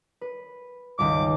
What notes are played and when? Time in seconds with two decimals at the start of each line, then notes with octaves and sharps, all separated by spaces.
0.21 B4
0.99 G1 C#2 D#3 D6